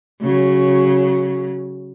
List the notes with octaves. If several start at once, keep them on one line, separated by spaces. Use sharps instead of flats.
C#3 F#3